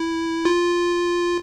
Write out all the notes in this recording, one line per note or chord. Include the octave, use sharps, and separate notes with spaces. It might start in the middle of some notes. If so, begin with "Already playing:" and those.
Already playing: E4
F4